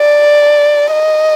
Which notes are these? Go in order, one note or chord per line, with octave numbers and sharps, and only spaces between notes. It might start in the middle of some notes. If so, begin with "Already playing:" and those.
Already playing: D5
D#5